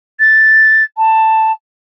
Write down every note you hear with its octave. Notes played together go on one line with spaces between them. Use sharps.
A6
A5